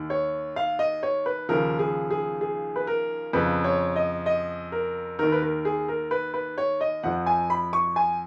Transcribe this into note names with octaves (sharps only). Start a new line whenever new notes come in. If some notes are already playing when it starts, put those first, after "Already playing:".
Already playing: D#2 D#3
C#5
F5
D#5
C#5
B4
D#2 C#3 F3 A#4
G#4
G#4
G#4
B4
A#4
F2 C#3 F3 B4
C#5
D#5
D#5
A#4
D#2 D#3 A#4
B4
A#4
G#4
A#4
B4
B4
C#5
D#5
F2 F3 F#5
G#5
B5
C#6
G#5